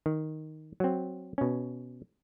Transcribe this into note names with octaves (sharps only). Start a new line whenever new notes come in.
D#3
F#3 C4
B2 C#4